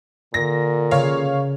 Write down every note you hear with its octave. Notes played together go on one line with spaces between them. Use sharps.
A#2 D3 A#6
C#3 C#5 F5